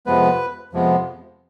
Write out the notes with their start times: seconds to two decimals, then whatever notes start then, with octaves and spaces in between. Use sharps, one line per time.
0.06 F2 C3 F3 G#3 B3 B4
0.73 F2 C3 F3 G#3 B3